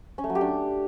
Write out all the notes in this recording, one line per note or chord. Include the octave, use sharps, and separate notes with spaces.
C#4
A3
F#3
G4
D4